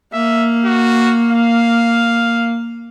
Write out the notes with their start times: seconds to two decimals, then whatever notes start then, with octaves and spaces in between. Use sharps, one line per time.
0.13 A#3 E5
0.65 F#4
1.31 F5